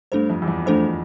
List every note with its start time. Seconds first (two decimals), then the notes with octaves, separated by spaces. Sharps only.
0.12 G2 A3 D4 A4 C5
0.30 F2
0.42 E2
0.48 F2
0.66 F2 A3 D4 A4 C5